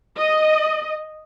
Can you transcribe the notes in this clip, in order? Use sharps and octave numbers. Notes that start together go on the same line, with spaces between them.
D#5